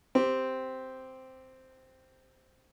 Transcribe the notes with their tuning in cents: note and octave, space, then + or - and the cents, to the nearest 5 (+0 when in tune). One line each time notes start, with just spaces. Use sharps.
C4 -5 G4 +0 G5 +0